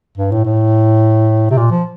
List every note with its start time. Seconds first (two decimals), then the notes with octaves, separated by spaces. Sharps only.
0.18 G2
0.32 A2
0.45 A2
1.51 C3
1.58 A#2
1.71 F3